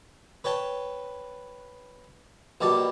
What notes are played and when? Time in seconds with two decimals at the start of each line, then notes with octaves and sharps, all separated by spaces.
0.44 B4 C#5 G5 A5
2.61 A#1 B2 G3 D5 A5